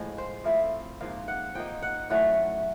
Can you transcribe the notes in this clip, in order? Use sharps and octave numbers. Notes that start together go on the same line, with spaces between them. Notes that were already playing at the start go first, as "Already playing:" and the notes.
Already playing: A2 F3 G#3
C5
F3 A3 C4 E4 F5
G#2 F3 A#3 F5
F#5
F3 A#3 D#4 G5
F#5
A2 F#3 A3 C#4 F#5